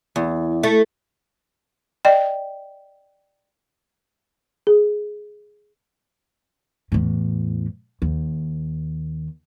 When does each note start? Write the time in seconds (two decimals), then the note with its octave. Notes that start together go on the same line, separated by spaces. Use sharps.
0.16 E2
0.63 A3
2.05 D5 D#5 G5
4.67 G#4
6.92 E2 A2
8.02 D#2